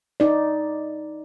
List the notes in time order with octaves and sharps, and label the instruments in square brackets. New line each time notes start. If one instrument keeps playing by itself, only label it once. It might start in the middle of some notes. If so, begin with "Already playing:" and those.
[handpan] D#4 D5